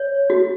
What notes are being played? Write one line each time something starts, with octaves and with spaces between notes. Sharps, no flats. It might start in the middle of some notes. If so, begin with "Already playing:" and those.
Already playing: C#5
F#4